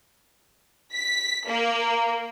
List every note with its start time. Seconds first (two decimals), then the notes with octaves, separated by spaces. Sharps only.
0.94 B6
1.47 A#3